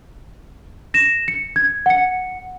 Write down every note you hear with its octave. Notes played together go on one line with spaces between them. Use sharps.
A#6 E7
C#7
G#6
F#5 C#7